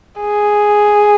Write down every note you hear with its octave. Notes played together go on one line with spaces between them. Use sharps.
G#4